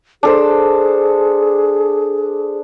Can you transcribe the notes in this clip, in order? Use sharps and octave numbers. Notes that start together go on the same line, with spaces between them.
D4 G#4 A4 C5